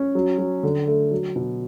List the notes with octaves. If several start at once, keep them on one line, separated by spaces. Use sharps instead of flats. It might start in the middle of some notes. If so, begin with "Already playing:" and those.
Already playing: C#4
F#3
F#3
D3
A3
F#3
B2